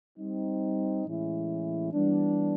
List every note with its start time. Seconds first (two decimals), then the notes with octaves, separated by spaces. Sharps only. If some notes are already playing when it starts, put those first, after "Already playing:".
0.18 G3 C4 D#4
1.05 A2 E3 G#3 C#4 E4
1.92 E3 G3 B3 D4